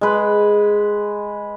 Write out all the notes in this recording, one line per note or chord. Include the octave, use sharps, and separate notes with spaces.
G#3 B4